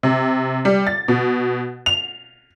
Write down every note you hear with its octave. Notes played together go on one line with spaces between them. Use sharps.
C3
G3
A6
B2
F7